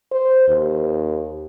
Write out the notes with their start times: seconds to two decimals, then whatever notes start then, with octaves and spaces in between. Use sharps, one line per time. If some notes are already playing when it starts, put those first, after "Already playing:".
0.11 C5
0.48 D#2